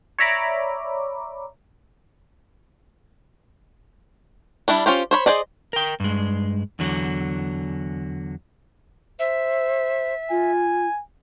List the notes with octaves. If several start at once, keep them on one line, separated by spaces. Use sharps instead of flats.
C#5 D5 E5 A#5 B5 D6
G3 D4 E4
C#4 F4 G4 C5
C5 C#5 B5
G#4 C5 D5 D#5
A#4 G5
G2 G#3
E2 D3 F#3
C5 E5
F4 G#5